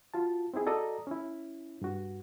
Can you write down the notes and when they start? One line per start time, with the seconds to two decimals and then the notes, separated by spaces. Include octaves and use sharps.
0.14 F4 F#4 A5
0.54 C4 D#4 E4 G#4
0.66 F#4 A4 D5 D#5 A#5 D#6
1.07 C#4 E4
1.82 G2 F#4